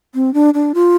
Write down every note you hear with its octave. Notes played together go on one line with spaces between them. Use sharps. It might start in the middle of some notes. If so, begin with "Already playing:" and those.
C4
D4
D4
F4